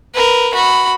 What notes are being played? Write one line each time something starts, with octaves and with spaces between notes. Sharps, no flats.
A#4 B4
F#4 B5